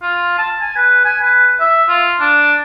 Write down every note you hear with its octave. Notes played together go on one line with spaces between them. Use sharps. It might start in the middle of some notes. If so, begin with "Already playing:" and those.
F4
A5
G#5
B4
G#5
B4
E5
F4
D4